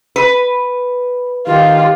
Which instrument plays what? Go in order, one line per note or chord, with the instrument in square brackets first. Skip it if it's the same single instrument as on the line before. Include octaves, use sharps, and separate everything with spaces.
[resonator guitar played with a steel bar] B4
[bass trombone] D#3 [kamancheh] F4 [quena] G4